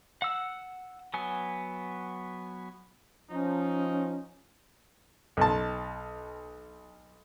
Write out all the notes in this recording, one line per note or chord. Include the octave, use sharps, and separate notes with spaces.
F#5 E6
F#3 B3 G#5
F3 C#4 D#4
B1 A5